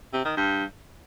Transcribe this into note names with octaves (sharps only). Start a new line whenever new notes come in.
C3
D#3
G2